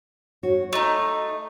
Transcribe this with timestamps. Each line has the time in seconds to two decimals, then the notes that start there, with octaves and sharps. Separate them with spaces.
0.43 F#4 C#5
0.73 A3 D#4 D#5